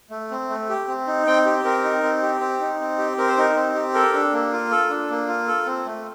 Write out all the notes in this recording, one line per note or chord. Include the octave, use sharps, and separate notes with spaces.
A3
C4
A3
G4
C4
D#4
C4 G5
G4
C4 A#4
D#4
C4
G4
C4
D#4
C4
G4
C4 A#4
C5
D#4 A#4
C4
G4
A4 A#4
D4
A#3
F4
A4
D4
A#3
F4
A4
C4
A3